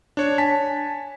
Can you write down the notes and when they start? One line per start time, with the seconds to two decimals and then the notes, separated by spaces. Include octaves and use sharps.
0.17 D4 C#5
0.38 G#5 A5 B6